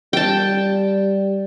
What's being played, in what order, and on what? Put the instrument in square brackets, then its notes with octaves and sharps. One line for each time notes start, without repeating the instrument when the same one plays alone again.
[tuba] G3 [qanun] G5 A5